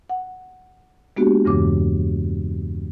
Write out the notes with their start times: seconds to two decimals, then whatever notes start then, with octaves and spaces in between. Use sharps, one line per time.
0.10 F#5
1.17 G#3 A#3 B3 D4 F#4 G4
1.45 E2 G2 C#3 E3 D6